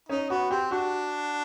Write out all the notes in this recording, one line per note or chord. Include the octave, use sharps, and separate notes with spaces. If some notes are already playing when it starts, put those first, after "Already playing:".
C#4 D#4
B3 F#4
C4 G4
D4 F#4